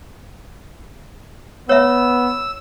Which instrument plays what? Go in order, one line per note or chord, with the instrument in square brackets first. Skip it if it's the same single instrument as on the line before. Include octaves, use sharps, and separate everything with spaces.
[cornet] B3 [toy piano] C#5 E5 [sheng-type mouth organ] E6